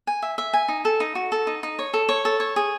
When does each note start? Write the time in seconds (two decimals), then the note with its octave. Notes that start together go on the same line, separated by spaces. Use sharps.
0.07 G#5
0.22 E5
0.38 E5
0.53 G#5
0.68 D#4
0.85 A4
1.00 D#4
1.15 F#4
1.32 A4
1.47 D#4
1.63 D#4
1.79 C#5
1.94 A4
2.09 C#5
2.25 A4
2.40 C#5
2.56 G#4